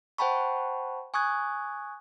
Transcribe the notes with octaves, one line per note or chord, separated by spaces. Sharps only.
C5 F#5 G5 A5 B5 C#6
G#5 C#6 D#6 F#6 G#6